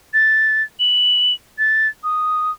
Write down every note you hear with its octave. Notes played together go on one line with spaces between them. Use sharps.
A6
F#7
A6
D#6